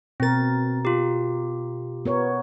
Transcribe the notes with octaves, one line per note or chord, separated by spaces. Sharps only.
B2 C4 A#4 A6
F4 G4
B3 A#4 C#5